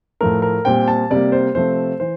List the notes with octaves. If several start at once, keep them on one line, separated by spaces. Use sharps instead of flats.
A2 F3 A3 A#4
A#4
A#2 G3 C4 G5
A5
C3 G3 A#3 D5
C5
C3 F3 A3 C4 C5
E3 C5